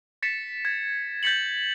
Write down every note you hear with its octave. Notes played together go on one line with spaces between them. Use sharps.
A6 B6 C#7 E7
G#6
G6 A6 B6 C#7 F#7